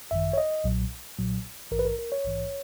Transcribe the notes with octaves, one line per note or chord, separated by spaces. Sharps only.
G#1 F#2 D#3 E5
C#5
D#5
B1 A#2 F#3
B1 A#2 F#3
A#1 G#2 E3 A#4
B4
A#4
A#4
C#5
A#1 G#2 E3